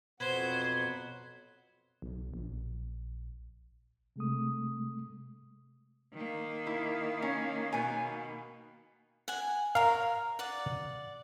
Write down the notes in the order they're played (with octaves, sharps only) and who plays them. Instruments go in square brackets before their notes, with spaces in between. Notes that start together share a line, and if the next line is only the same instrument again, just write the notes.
[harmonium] F2 F#3 F#5 [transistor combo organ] B2 B4 [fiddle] C5 [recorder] G#6
[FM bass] B1
A#1
[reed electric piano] C3 G#3 A3 D#6
[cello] D#3 A#3
[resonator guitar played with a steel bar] E4
C#4
B2 G#5
[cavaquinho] F#5 G#5
[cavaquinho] A#4 C#5 [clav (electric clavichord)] F5
[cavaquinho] D5 F#5